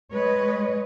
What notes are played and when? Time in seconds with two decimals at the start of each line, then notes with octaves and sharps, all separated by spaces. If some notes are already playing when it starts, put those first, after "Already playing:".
0.13 G#3 B4 C#5 D#5